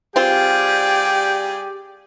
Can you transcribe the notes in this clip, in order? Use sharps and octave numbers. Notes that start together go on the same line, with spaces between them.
G3 C4 F4 G4 G#4 D5 G5